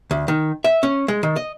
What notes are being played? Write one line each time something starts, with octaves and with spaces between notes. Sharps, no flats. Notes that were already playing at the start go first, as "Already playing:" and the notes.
D2
D#3
E5
C#4
G#3
D#3
D#5